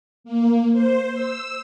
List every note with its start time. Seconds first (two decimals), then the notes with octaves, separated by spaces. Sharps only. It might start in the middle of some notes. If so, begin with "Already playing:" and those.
0.24 A#3
0.72 C5
1.14 E6